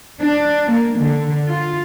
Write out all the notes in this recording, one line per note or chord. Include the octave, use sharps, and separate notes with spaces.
D4
A#3
D3
F4